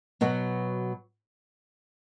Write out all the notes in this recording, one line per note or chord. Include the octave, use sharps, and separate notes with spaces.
B2 F#3 B3 F#4